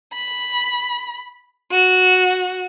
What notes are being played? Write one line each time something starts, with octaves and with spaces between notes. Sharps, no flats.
B5
F#4